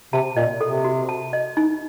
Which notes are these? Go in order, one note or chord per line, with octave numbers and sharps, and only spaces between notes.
C3 A5
A#2 D#5
C3 A4
F#4
A5
D#5
D#4